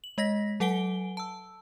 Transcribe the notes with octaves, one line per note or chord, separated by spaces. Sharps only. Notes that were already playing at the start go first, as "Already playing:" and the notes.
F#7
G#3 D#5 A#6 B6
F#3 A4 F#5 G#5 D7 G7
A5 E6